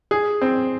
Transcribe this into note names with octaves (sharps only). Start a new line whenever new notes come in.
G#4
C4